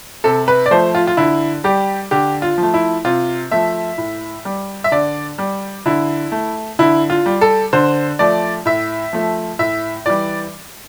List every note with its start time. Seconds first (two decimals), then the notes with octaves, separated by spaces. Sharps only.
0.24 C3 A4
0.48 B4
0.66 D5
0.71 F3 A3 C5
0.95 F4
1.07 F4
1.17 D3 E4
1.64 G3 G4
2.11 D3 G4
2.42 F4
2.58 F3
2.63 A3
2.74 E4
3.05 C3 F4
3.51 F3 A3 E5
3.98 A2
4.45 G3
4.84 E5
4.92 D3 D5
5.38 G3
5.86 D3 E4
6.32 A3
6.79 D3 E4
7.10 F4
7.26 G3
7.41 A4
7.73 D3 C5
8.19 F3 A3 D5
8.65 A2 E5
9.13 F3 A3
9.59 A2 E5
10.06 E3 G3 D5